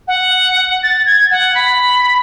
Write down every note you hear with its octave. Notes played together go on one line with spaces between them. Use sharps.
F#5
A6
G#6
F#5
B5